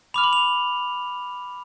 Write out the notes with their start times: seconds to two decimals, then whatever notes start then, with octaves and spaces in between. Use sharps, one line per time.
0.14 B5 D6 F6 F7
0.24 F#7
0.33 F7